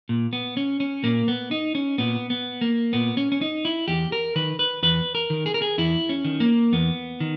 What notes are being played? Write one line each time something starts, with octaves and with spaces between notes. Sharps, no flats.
A#2
B3
C#4
C#4
A#2 A#3
B3
D#4
C#4
A#2 B3
B3
A#3
A#2 B3
C#4
C#4
D#4
E4
E2 G4
A#4
D#3 B4
B4
E2 B4
A#4
D#3
G#4
A#4
G#4
E2 E4
C#4
D#3
A#3
E2 B3
D#3